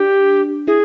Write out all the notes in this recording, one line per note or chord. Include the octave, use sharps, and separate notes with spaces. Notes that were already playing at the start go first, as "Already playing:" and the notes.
Already playing: D4 G4
E4 G#4